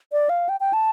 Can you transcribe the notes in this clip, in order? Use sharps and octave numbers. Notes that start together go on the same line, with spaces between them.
D5
F5
G5
G5
A5